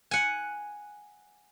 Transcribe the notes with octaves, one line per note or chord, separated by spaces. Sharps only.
F#5 G#5